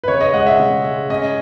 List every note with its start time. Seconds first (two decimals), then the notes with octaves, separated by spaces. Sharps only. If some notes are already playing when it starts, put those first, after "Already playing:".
0.04 B4
0.08 C#3 C#5
0.21 D#5
0.34 G#3 F#5
0.41 D#5
0.46 E5
0.60 C#3
0.84 G#3
1.10 C#4 D#5